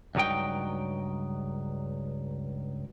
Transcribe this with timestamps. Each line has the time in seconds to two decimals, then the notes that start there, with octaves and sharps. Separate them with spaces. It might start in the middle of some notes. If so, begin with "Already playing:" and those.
0.15 C#2 G2 F#3 D#4 G5